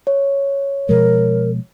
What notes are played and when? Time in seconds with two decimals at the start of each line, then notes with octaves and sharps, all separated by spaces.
0.07 C#5
0.89 B2 F3 G#3 A#4